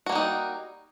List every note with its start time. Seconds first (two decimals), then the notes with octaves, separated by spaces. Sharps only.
0.06 F#4
0.09 A#3
0.12 G3
0.15 D#4